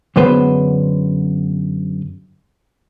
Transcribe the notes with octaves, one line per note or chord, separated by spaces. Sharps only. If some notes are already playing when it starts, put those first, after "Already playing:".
F#2 D3 G#3 B3 B4 C5